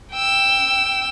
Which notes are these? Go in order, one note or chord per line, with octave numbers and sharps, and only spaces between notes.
G5 E6